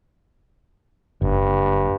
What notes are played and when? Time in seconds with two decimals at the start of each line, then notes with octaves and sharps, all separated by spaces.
1.21 F#1 G2